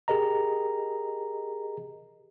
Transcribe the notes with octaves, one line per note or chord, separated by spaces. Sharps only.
G4 G#4 A#4 D#5 A#5